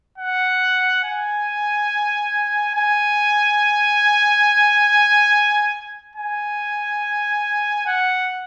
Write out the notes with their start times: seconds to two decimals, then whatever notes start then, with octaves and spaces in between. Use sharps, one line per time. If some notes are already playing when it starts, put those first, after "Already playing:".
0.18 F#5
1.04 G#5
2.75 G#5
6.16 G#5
7.87 F#5